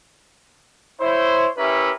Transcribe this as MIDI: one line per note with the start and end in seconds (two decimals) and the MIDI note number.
1.00 1.48 64
1.00 1.48 72
1.00 1.48 73
1.57 1.92 61
1.57 1.92 64
1.57 1.92 67
1.57 1.92 70
1.57 1.92 71
1.57 1.92 76